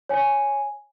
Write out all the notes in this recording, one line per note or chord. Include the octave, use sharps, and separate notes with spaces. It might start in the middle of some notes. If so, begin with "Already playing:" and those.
C#5 G#5